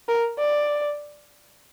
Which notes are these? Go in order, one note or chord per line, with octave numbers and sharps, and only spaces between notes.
A#4
D5